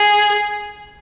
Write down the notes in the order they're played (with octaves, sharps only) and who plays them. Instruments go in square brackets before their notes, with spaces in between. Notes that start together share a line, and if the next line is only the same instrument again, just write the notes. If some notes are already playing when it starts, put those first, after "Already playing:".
Already playing: [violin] G#4